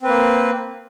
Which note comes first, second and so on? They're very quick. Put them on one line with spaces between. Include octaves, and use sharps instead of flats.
C4 B4 A#3